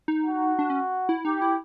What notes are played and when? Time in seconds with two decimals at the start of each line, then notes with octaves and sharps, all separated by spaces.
0.08 D#4
0.24 F#4
0.59 D4
0.70 C#4
1.09 E4
1.25 D#4 G4
1.42 E4